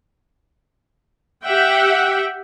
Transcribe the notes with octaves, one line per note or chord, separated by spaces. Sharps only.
G4 E5 F#5 G5